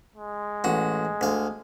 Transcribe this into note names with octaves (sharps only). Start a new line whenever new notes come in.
G#3
A1 F#4
D2 F5